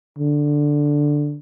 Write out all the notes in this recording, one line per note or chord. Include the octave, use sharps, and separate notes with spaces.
D3